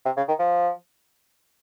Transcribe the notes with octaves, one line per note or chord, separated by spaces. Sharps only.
C3
C#3
D#3
F3